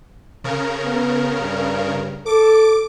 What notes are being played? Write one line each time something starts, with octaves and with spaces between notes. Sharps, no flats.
C#3 A#4
B3
G2
A4 D6 D7